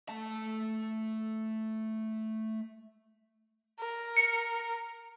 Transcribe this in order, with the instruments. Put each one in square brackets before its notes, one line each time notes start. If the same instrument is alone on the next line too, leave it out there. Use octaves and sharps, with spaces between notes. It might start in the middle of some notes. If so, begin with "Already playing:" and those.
[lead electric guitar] A3 A5
[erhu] A#4
[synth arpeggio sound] C#7